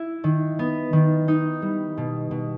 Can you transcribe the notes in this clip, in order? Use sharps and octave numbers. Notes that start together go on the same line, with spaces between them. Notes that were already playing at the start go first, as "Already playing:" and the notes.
Already playing: E4
D#3
B3
D#3
D#4
G3
B2
B2